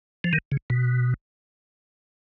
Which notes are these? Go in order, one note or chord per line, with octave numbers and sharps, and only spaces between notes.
F3
D#3
C#3
B2